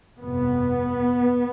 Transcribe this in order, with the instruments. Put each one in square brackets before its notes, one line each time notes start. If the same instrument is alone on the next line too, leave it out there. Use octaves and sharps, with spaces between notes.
[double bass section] G1 F2 C3 B3